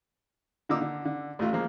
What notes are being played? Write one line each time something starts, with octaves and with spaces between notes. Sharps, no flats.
D3 A#3 D#4 F4 D6 E6
D3
D3
A1 A2 A3 F4
F3 G#3 A#3